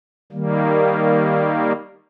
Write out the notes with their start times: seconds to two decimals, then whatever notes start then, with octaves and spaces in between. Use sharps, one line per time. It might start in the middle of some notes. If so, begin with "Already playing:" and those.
0.32 D#3 G3 A#3